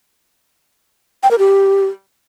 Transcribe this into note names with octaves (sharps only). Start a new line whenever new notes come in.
G5
A#4
G4